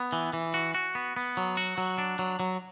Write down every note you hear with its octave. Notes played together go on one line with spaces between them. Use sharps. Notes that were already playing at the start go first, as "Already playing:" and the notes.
Already playing: B3
E3
E3
F#4
F#4
B3
B3
F#3
F#4
F#3
D4
F#3
F#3